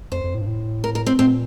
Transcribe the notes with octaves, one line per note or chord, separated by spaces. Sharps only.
F2 C5
F2
A2
G2
A2
A#4
A#4
C4
A#2 C4